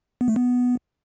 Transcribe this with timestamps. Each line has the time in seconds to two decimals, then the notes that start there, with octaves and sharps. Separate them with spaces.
0.21 B3
0.28 A3
0.36 B3